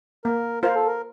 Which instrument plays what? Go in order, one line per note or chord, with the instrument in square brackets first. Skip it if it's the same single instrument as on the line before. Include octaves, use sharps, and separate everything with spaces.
[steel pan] A#3 [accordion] A#4
[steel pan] F4 C5 F5 [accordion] A#4
[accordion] A4
A#4